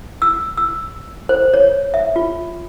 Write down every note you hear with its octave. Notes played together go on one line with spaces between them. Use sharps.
E6
E6
C5
C#5
E5
F4